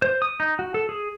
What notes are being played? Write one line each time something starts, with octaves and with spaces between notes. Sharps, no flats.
C5
D#6
D#4
F#4
A4
G#4